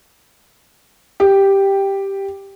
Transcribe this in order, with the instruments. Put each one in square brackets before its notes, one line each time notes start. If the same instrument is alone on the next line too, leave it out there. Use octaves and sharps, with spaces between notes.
[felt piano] G4